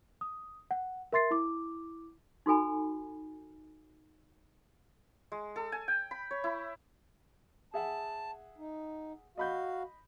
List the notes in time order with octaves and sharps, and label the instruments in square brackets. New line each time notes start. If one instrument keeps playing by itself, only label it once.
[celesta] D#6
F#5
A#4 E5 C6 A6 C7
E4 D6
[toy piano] D#4 F#4 A4 G#5 B5
[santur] G#3
A4
G#5
G5
B5
C#5
E4
[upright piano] G#4 E5 F#5 [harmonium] A5
[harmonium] D#4
[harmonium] F#4 F5 [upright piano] D#5 B5 G6